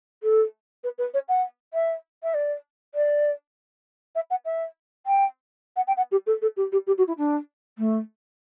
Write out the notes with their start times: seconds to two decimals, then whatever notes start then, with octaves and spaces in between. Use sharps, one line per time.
0.23 A4
0.83 B4
0.98 B4
1.14 C#5
1.28 F#5
1.73 E5
2.23 E5
2.34 D5
2.94 D5
4.15 E5
4.30 F#5
4.45 E5
5.06 G5
5.76 F#5
5.87 G5
5.97 F#5
6.11 G4
6.26 A4
6.41 A4
6.56 G4
6.72 G4
6.86 G4
6.97 F#4
7.07 E4
7.17 D4
7.78 A3